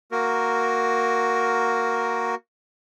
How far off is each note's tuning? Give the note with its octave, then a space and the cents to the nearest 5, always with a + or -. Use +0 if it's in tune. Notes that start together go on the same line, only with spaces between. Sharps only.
A#3 +0 F#4 +0 A#4 +0